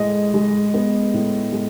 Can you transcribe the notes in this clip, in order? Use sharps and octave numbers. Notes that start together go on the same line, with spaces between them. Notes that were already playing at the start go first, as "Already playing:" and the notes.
Already playing: A2 G#3 D#5
G#3
B3
A2
G#3